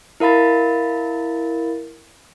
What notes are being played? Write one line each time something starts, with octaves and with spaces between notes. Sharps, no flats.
E4 A#4 F5 B5 A6